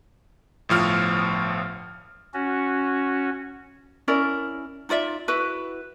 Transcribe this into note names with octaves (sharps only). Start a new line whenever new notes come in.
G1 A2 F3 F6
C#4 F#4
C#4 E4 A#4 D5
D#4 F4 D5 E5
E4 F#4 B4